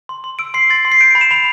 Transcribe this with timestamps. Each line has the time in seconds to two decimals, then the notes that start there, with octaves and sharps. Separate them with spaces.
0.09 C6
0.24 C6
0.39 E6 D7
0.54 C6 C7
0.70 C6 A6
0.85 C6
0.92 C7
1.01 G6 D7
1.11 D7
1.15 B5
1.21 E7
1.31 B5 F7